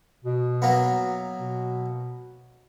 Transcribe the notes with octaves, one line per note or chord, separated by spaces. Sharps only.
B2
F#3 A#3 B3
B2